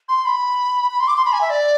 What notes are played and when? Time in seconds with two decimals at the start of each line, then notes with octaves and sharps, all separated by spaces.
0.09 C6
0.25 B5
0.91 B5
1.00 C6
1.08 D6
1.16 C6
1.25 B5
1.33 G#5
1.41 E5
1.50 D5